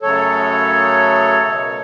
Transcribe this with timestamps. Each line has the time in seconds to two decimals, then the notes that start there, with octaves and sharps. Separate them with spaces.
0.02 F#2 C#3 F#3 A3 A4 C#5
1.42 B2 A3